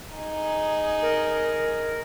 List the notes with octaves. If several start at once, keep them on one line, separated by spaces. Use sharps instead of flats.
D#4 G#4
A#4